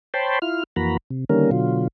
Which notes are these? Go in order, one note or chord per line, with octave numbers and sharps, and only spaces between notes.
C5 C#5 G5 A5 B5 C6
E4 F4 F6
F2 E3 A#3 F#4 A#5 B5
C3
D3 D#3 G3 A#3 C#4 A#4
B2 D3 F#3 F4